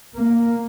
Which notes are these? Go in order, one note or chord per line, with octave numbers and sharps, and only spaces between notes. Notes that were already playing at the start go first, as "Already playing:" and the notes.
A#3